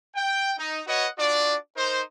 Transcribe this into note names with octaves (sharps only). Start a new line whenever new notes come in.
G5
D#4
F#4 B4 C#5 D#5 F#5
D4 F4 F#4 D5
D#4 A#4 C5